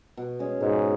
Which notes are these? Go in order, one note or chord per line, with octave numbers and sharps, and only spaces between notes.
B2
G#3 C#4 G#4
G#2 B2